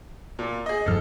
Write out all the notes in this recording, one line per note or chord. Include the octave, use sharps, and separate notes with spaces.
A#2
G#4 D#5
E1 G2 F3 A4 F6